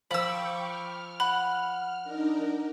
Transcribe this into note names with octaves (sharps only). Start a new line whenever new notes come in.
F3 G5 B5 C#6 D6 E6
F6
F#5 B5
D4 D#4 A#4